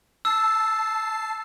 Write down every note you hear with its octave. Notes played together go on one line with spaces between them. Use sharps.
A5 E6 C7